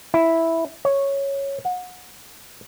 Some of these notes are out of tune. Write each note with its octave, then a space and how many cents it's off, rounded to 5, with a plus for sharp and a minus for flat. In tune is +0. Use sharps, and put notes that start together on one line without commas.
E4 -5
C#5 -5
F#5 -30